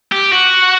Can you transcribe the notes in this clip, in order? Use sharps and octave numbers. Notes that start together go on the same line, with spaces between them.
G4
F#4